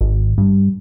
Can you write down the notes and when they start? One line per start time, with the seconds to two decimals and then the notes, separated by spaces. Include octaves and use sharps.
0.01 G#1
0.38 G2